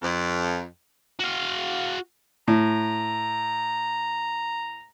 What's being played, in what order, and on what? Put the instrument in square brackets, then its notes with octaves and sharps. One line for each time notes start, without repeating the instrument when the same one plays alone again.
[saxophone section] F2
[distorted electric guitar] F#4 F5
[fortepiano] A2 [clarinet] A#5